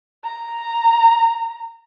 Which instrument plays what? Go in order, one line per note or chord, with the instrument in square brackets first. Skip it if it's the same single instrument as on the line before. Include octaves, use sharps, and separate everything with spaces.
[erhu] A#5